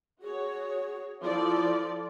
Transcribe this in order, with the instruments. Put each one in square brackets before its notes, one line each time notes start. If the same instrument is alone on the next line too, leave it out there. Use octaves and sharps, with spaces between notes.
[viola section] F#4 C#5 [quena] G#4
[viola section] F3 A4 D5 [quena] E4